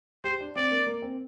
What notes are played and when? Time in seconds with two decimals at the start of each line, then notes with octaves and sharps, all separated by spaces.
0.24 G4 C5
0.40 D4
0.56 C4 D5
0.71 A#3
0.87 A#3
1.02 C4